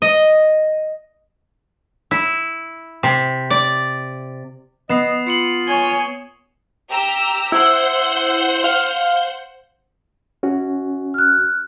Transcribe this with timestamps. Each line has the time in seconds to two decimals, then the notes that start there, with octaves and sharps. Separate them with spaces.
0.02 D#5
2.11 E4
3.03 C3
3.50 D5
4.89 B3 D#5 D#6 C7 E7
5.27 F4 C7 C#7 F#7
5.68 C#5 G#5 G7
6.90 G4 A#5 E6
7.52 E4 C5 F#5 G6
8.64 F5
10.43 C#4 F#4
11.14 F6 F#6